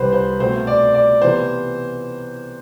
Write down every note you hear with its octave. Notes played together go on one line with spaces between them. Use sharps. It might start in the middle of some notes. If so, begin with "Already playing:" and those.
Already playing: C2 C3 E3 G3 C4 B4 C5
C5
B2 A3 C4 C5
D5
D5
C3 E3 B3 C5